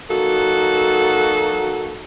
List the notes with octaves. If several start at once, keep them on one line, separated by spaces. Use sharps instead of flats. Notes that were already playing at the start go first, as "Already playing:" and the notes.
F#3 A#3 D#4 F#4 A4